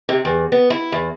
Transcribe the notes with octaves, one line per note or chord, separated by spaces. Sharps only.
C3
E2
B3
E4
E2